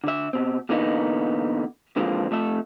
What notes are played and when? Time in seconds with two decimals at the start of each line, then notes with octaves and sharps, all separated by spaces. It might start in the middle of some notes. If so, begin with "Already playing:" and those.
0.04 D3 E5
0.33 B2 C4
0.69 B2 D3 E3 A#3 B3 D#4
1.97 D3 E3 F3 G#3 A#3 C4
2.31 F2 A3 A4 E5